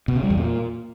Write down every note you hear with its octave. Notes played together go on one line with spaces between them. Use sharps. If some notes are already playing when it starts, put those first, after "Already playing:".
B2
C#3
G3
E2
A#2